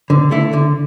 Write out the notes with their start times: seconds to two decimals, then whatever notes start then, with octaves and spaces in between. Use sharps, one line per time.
0.10 D3
0.31 A3 E4
0.53 D3